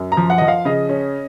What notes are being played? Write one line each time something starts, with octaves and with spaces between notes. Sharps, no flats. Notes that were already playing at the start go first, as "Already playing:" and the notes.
Already playing: F#2
A#5
F3
F#5
F3 D#5
F5
C#3 D#5
C#4